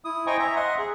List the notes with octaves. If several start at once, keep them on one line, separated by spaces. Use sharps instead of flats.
E4 D#6
C5 D#5 G5 G#5 A#5 C#6
E5 A#5
D#5 E5 F#5 C6
G#4